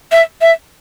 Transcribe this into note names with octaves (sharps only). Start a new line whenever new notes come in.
E5
E5